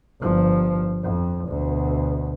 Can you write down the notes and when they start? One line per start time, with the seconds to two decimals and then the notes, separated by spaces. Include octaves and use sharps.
0.21 G1 F3
1.03 F2
1.49 D2 B2